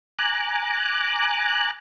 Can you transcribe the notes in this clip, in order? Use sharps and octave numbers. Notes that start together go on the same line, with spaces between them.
G#5 A#5 D6 F#6